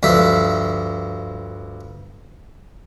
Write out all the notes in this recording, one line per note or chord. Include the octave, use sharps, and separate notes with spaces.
D2 G2 F3 E5